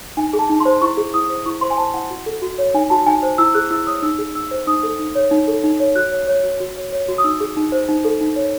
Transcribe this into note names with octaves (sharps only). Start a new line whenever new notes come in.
D#4 G#5
G#4
A5
D#4
C6
C5
E4 C#6
G#4
E4 D#6
C5
E4 C#6
C5 C6
G#5
C5 A5
E4 F#5
F#4
A4
F#4
C#5
D#4 G#5
F#4 A5
D#4 G#5
C5
E4 E6
G#4 F#6
E4 E6
C#5 D#6
D#4 E6
G#4
D#4 E6
C5
D#4 D#6
A4
D#4
C#5
D#4
A4
D#4
C#5
F#4 F#6
C#5
C#5
F#4
F#4
C#5
C#5
F#4
D#6
D#4 E6
G#4
D#4
C5
D#4
A4
D#4
C#5